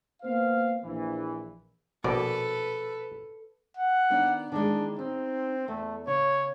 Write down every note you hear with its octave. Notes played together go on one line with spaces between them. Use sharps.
A#3 B3 C5 F5
A#1 E3
A#1 B2 A4 B4 D5
F#5
D#3 B3 D4
D#3 E3 G#3 D4
C4 D#4
E2 A3
C#3 C#5